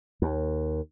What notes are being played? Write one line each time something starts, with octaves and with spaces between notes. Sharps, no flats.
D#2